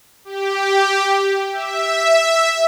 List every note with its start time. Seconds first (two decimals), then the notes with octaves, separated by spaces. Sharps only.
0.25 G4
1.52 E5